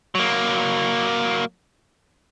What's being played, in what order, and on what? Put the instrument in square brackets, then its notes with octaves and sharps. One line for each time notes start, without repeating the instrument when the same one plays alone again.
[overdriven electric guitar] F#3 A#3